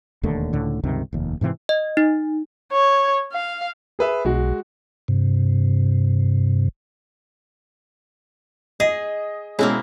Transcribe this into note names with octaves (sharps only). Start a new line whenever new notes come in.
E1 D#2 D3 A3
C#2 A2 D3
C#2 G2 C3 D#3
F1 D#2
G#2 C3 E3 C4
D#5
D#4
C#5
F5
G#4 B4 E5
B1 G#3 F#4
G2 C3
G#4 D#5
B2 G#3 A#3 C4 C#4 E4